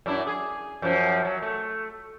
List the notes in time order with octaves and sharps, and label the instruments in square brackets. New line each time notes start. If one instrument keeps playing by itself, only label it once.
[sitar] F#2 D4 E4
G#4
F#2 F3
F#3
A3